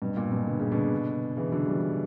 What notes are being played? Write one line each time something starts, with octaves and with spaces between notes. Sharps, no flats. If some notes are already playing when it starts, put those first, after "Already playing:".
G2 B2
A#2
G2 B2
D3
C#3
B2 D3
C#3 E3
D3 F#3
E3 G3